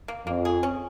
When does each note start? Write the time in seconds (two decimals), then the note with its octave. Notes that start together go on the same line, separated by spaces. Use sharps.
0.08 A#3
0.26 F2 A#3
0.45 G#4
0.63 C#4